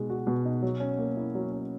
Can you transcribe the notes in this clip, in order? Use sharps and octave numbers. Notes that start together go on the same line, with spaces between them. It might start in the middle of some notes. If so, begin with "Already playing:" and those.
Already playing: B2 G#3 D#4
F#4
B2
D#4
F#3
C#4
A#3
E4
F#3
C#4